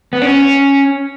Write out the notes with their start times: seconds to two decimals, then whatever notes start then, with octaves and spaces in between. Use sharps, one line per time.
0.13 B3
0.22 C#4